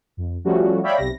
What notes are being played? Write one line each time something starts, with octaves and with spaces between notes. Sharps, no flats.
F2
F3 G3 A3 C#4 F#4
C#5 D5 E5 F5 G5 B5
B1 C3 A#6